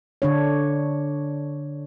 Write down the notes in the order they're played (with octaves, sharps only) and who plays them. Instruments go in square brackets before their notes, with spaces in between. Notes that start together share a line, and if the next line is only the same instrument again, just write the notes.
[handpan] D3 D4 C#5